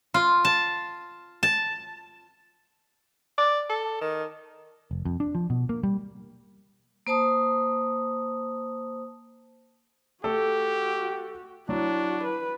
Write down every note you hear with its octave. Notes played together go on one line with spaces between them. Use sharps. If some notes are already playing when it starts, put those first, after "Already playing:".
F4
A5
A5
D5
A4
D#3
F1
F2
D4
F3
B2
A#3
G3
A#3 C5 A5 D#6
A3 F#4 G4 A4
F#3 D4 E4 F#4
B4